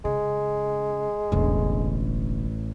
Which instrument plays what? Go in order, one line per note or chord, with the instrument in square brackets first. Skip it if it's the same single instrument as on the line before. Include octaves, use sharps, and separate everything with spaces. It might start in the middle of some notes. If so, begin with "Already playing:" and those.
[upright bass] C#3 [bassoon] G#3
[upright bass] E1 D3 [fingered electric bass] A1